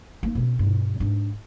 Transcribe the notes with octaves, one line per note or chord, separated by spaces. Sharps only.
A#3 D#4
B2 C#4
G2 B2
G#2 D4